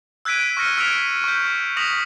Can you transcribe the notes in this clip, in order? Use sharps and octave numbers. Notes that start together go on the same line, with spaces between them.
E6 F#6 G#6 B6 D7 D#7
C#6 F6 A#6 C#7 D#7
E6 F6 G#6 B6 D7 F7
C#6 G6
C#6 D#6 A#6 B6 F7 F#7